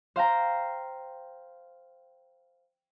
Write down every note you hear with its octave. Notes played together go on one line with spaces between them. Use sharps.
C5 F5 G5 A#5